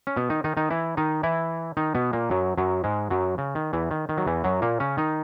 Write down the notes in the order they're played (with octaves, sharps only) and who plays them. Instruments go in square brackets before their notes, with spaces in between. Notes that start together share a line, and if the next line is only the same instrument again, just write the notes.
[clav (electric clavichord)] C#4
B2 B3
D#3 D#4
D#3 D#4
D#3 D#4
E3 E4
D#3 D#4
E3 E4
D#3 D#4
B2 B3
A#2 A#3
F#2 F#3
F#2 F#3
G#2 G#3
F#2 F#3
C#3
D#3
E2 E3
D#3
D#3
F#3
E2 E3
F#2 F#3
A#2 A#3
C#3 C#4
D#3 D#4